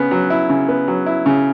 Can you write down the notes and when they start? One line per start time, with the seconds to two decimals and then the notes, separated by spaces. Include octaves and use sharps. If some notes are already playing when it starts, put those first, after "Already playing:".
Already playing: C#3 B3
0.11 F#3
0.30 E4
0.49 C#3
0.68 B3
0.88 F#3
1.06 E4
1.26 C#3